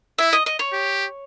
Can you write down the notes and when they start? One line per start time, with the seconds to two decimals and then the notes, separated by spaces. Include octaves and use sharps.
0.18 E4 E5
0.33 D#5
0.46 D#5
0.59 C#5
0.73 G4